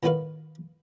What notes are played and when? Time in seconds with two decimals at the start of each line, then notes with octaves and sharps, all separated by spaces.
0.03 A2 D#3 B3 F#4 B4 F5